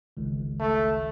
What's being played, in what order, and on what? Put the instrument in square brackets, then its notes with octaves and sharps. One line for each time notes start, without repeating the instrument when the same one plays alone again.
[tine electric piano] G1 C#2 D#3
[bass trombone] A3